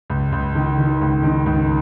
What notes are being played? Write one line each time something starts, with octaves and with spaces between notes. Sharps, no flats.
C#2
C#2
D#3
D#3
C#2
D#3
C#2